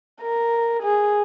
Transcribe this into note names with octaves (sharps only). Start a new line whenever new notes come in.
A#4
G#4